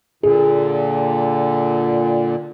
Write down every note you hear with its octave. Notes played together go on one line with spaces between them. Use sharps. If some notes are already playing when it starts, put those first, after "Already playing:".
A#2 D3 G#4